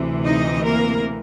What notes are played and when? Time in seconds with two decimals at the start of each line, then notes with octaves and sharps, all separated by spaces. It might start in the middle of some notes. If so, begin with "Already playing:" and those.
Already playing: D2 C3 E3
0.23 D#4 D#5
0.62 A#3 A#4